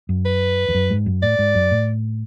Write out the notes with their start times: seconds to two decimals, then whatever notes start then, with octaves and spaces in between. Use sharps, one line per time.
0.09 F#2
0.25 B4
0.68 E2
0.74 F#2
0.90 G#2
1.06 F#2
1.23 A2 D5
1.39 G#2
1.55 F#2
1.71 A2